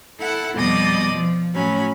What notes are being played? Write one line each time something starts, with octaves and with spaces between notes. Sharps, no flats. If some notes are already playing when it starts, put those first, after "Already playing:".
E4 A4 F#5
F2 B2 G3 D5 D#5 D#6
F3
A2 F#3 C#4 B5